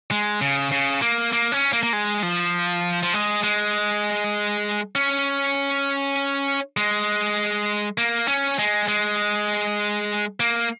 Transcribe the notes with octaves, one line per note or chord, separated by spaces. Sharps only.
G#3
C#3
C#3
A#3
A#3
C#4
A#3
A#3
G#3
F3
F3
G#3
G#3
C#4
G#3
A#3
C#4
G#3
G#3
A#3